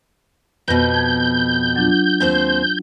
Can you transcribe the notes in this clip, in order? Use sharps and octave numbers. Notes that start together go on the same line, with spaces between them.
F2 B2 B4 G6 A#6
A5 G#6
F#3 D4 F4
D#2 C4 C5